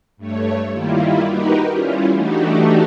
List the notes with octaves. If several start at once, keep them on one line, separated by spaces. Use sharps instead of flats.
G2 A3 C#5
D#3 G3 A#3 E4 F4
D#4 F#4 G4 A#4 B4
G3 C#4 E4 F4
E3 A3 D4 D#4 F#4 G4